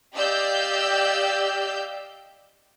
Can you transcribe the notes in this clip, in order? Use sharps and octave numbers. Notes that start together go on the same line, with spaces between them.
G4 D5 D#5 F5 E6 G6